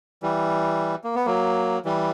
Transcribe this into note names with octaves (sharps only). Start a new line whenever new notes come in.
E3 G3
A#3
B3
F#3 A#3
E3 G3